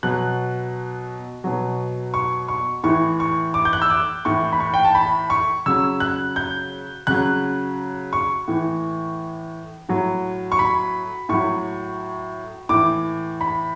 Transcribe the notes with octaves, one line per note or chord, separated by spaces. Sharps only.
B2 F#3 F#6
B2 F#3
C#6
C#6
A2 E3 C#6
C#6
D6
G6
F#6
E6
D6
A2 E3 C#6
B5
C#6
G5
A5
B5
C#6
C#3 F#3 E6
F#6
G6
C#3 F#3 F#6
C#6
A2 E3
A2 F#3
C#6
B5
A2 F#3 C#6
A2 E3 D6
B5